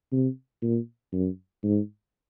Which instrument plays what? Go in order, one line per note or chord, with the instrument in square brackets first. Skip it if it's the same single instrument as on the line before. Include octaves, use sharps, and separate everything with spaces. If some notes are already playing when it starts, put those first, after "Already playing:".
[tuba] C3
A#2
F#2
G#2